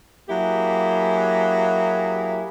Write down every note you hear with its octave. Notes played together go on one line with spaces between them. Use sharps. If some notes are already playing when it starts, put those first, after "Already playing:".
F#3 A#3 E4 G4 G#4